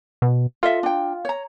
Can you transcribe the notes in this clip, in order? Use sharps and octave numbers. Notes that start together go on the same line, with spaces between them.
B2
F4 A4 D#5 E5
D4 G5
C#5 A#5